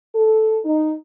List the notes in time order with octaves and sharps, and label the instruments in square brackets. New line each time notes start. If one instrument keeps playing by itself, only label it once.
[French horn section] A4
D#4